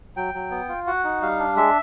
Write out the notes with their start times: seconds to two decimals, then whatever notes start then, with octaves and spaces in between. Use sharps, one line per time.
0.16 F#3 G5
0.34 F#3
0.51 B3
0.69 F4
0.87 F#4 F#5
1.04 D#4
1.21 G3 F5
1.39 D4
1.56 G#3 E5